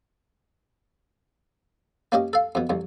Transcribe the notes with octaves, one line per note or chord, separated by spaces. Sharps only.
A#3 C#4 G4 D#5
A4 F5
F2 B2
C2 F2